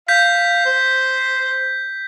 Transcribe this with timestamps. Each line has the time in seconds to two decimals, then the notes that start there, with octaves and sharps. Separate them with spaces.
0.08 F5 G6 B6
0.66 C5